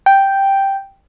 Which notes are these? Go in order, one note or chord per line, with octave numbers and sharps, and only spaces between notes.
G5